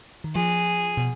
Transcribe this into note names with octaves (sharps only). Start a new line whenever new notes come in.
D#3
F3 G#4
B2